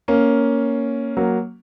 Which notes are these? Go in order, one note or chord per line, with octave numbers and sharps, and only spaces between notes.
A#3 C#4
F#3 A#3